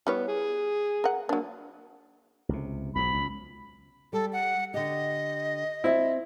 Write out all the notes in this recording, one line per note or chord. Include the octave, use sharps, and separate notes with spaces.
G3 B3 E4 C#5
G#4
A#4 F#5
F#3 A#3 D4
C#2 C3
B1 G#2 B5
C#2
G3 A4
F#5
D3 G4 D#5
C4 E4 D5 E5